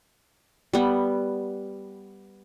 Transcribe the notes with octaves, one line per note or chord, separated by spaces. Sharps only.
G3 B3